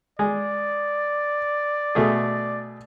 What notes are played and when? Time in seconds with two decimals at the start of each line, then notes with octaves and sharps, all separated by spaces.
0.19 G#3 D5
1.95 B2 A3 G#4